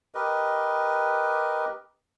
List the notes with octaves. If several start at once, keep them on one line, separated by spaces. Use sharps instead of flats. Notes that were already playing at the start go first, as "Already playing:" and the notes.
G4 A#4 B4 D#5